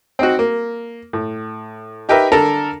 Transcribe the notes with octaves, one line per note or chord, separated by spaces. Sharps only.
C4 D#4 F#4
A#3
A2
D#4 G4 A#4 B4 E5
D3 A4 A#4 A5 A#5